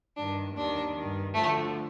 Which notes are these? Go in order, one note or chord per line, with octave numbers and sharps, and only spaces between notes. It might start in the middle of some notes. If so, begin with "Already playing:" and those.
G2 D#3 D4
D#2 D#3 D4
G2 D#3
D2 D3 F3 A3